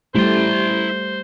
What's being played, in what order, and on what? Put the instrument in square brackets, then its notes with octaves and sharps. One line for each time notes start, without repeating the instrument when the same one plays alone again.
[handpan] G3 A3 G4 [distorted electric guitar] E4 C6 [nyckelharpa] C5